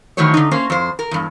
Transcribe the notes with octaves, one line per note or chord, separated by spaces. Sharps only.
D#3 E3 F#3 A3 C5 C#5
D3 D#4
A#3 C#4 C5
F2 C5
A#4
E2 G2